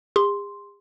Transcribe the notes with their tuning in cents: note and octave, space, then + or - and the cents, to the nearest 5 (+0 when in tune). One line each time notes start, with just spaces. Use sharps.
G#4 -45 C6 +0